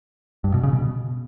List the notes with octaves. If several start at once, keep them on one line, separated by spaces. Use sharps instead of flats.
G2
B2
C#3
B2